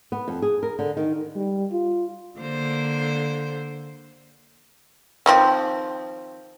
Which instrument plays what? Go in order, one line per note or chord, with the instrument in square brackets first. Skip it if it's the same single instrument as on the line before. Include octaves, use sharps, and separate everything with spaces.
[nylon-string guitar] B3
F2
G#4
A#4
D3
D#3
[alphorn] G3
F4
[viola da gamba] D3 A#3 C5
[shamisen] D#3 F3 C4